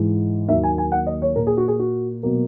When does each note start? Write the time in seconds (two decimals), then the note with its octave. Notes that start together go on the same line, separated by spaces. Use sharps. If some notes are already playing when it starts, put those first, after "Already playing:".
Already playing: G#2 E3 G#3
0.48 D#2 D#3 F#3 A#3 E5
0.63 G#5
0.78 G#5
0.92 F#5
1.07 D#5
1.22 C#5
1.36 A#2 A#3 A#4
1.47 G#4
1.57 F#4
1.68 G#4
1.79 F#4
2.23 B2 F#3 A#3